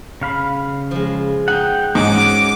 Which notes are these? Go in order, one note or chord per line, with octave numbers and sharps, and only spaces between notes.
C#3 F5 B5
F3 G#3
D#4 F#5 G5
G#2 C#4 F#4 G#4 D6